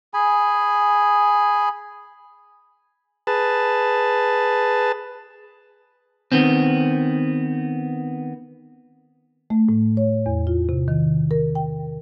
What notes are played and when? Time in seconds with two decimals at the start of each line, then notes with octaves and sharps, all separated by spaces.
0.14 G#4 G#5 B5
3.27 G#4 B4 A5
6.32 D#3 B3 C4
9.50 A3
9.69 A2
9.97 C#5
10.26 E2
10.47 F4
10.69 C3
10.88 D#3
11.31 A#4
11.55 G5